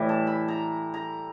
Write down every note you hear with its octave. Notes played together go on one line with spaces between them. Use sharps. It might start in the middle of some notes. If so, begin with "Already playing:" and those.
Already playing: A2 E3 G3
A5
B5
A#5
A#5